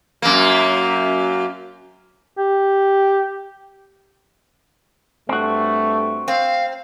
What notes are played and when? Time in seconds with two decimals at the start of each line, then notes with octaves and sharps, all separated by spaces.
0.22 F#2 A#3
2.38 G4
5.29 G2 A3 C4 F#4
6.28 C4 F5